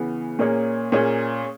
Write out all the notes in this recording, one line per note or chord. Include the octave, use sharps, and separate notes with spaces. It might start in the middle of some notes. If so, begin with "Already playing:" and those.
Already playing: C#3 E3 B3
A#2 A#3 C#4 G#4 C#5
A#2 A#3 C#4 G#4 C#5